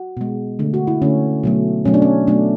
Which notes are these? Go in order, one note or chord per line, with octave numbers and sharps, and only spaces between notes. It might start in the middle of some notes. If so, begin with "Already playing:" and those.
Already playing: F#4
B2 G#3
D3 A3
F#4
E4
D3 A3 C#4
B2 F#3 A3
B2 F#3 A3 C#4
D4
C#4
B2 F#3 A3 D4